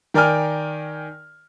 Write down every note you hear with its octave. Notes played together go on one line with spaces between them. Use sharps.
D#3 A#4 D5 G5 G#5 F6